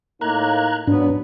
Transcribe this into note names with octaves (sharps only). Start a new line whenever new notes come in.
A2 A#3 D#4 A#5 F#6 G#6
G#2 F#3 B3 D4